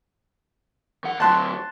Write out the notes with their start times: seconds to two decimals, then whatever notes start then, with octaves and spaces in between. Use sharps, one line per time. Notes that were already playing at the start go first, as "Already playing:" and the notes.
1.04 D#3 F#5
1.20 D2 F#3 A5 C6 F#6